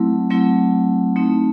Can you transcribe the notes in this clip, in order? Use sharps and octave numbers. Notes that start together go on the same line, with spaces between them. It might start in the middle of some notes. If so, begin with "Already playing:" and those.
Already playing: F#3 A3 C4 E4
F#3 A3 C4 E4
A3 C4 D#4